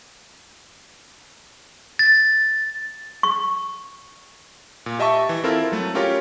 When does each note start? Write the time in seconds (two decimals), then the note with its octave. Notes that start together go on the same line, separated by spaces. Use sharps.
1.99 A6
3.23 C#6
4.86 A#2
4.99 G4 D#5 E5 A5 C#6
5.29 E3
5.44 C4 E4 F4 A4 A#4
5.72 F#3 A3
5.95 C#4 F4 G4 A#4 C#5